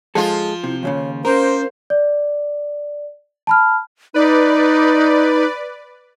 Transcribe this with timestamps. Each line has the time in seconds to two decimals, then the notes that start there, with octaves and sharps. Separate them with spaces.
0.15 F3 G#3 F4 G#4 A4
0.64 C3 E4
0.83 D#2 A#2 C#3 C#5
1.25 A#3 C#4 A#4 C5
1.90 D5
3.47 A5 B5 F6
4.14 D#4 B4 D5